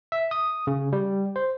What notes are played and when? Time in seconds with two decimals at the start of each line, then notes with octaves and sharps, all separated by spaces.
0.12 E5
0.31 D#6
0.67 C#3
0.93 G3
1.36 C5